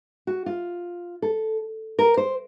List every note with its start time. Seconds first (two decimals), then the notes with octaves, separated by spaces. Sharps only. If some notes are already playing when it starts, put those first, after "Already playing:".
0.27 F#4
0.46 F4
1.22 A4
1.99 A#4
2.17 C5